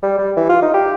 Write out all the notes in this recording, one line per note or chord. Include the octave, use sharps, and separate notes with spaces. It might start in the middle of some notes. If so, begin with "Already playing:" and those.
G3
G3
E3
F4
D#4
G4